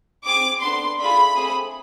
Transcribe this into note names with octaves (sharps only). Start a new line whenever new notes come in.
C4 G#4 D6
B3 D4 A4 C6
A3 D4 F4 G#4 B5
A3 C4 G#4